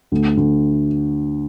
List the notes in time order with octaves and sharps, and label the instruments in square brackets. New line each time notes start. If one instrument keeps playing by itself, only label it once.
[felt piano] D2
D2